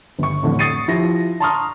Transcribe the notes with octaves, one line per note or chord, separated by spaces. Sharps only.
G1 C#6
F2 A2 D3 E3
C#6 D#6 A6 C7 C#7 D#7
F3 E4 G4 A#6
A5 A#5 C6 C#6 D#6 F6